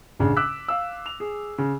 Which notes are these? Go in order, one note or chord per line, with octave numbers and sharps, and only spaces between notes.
A1 C#3 D4
D6 E6 F#6 B6
F5 E6
F7
G#4
C#3